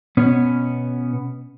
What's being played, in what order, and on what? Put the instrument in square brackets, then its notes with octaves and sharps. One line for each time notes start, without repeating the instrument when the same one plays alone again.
[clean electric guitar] B2 B3 C#4